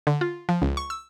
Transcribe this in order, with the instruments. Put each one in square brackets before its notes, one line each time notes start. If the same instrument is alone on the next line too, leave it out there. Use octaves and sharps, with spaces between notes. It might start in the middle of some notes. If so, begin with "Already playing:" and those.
[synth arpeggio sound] D3
F4
F3
C#2
C#6
E6